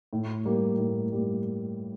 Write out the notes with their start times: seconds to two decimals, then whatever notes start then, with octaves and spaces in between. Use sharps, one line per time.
0.13 A2
0.45 G3 A#3
0.78 A2
1.12 G3 A#3